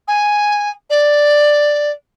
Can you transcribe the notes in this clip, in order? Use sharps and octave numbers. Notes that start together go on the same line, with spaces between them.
G#5
D5